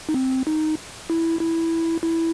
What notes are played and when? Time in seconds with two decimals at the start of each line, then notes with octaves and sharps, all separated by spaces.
0.09 D#4
0.14 C4
0.47 D#4
1.10 E4
1.41 E4
2.03 E4